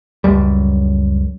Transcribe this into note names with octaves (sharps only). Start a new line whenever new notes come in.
C#2 F#2 G3